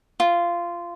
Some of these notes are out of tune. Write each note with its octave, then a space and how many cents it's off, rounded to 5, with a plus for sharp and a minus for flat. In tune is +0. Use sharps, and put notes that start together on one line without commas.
F4 -15